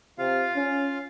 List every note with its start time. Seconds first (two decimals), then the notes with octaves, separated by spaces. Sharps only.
0.18 C3 F4 F5
0.55 C#4